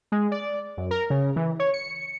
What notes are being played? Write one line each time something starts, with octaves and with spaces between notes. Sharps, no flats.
G#3
D5
F#2
A#4
C#3
E3
C#5
C#7